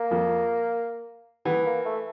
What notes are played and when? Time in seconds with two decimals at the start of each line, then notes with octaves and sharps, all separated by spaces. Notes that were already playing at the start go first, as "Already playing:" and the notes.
Already playing: A#3
0.11 F2 F3
1.45 E3 B3
1.66 A#3
1.85 A3